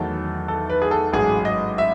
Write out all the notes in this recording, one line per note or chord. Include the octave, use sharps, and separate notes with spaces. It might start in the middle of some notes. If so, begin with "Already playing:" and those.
Already playing: E2 D#3 F#3 A3 A4
A4
B4
G#4
A4
A1 G#2 F#3 G#4
D#5
E5